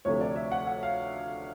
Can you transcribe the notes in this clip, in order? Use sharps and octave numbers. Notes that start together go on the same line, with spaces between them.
D2 C3 F3 A3 C#5
D5
E5
F#5
F#5
F5